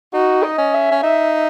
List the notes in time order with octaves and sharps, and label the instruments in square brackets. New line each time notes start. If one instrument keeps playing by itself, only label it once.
[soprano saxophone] D#4 [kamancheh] F#4
[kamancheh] D#5
[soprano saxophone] C#4
[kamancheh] E5
[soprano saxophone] C#4
[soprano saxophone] D#4 [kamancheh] E5